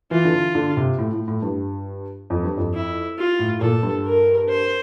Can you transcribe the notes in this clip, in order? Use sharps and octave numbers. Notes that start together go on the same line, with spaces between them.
E3 F4
D3
E3
D3
C3
A2
A2
A2
G2
F2
G2
F2
E4
F4
A2
A#2 A4
G2
A#4
C5